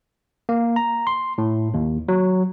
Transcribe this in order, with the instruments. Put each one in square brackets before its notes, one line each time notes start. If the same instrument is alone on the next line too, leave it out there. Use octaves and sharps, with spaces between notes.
[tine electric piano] A#3
A#5
C6
A2
D#2
F#3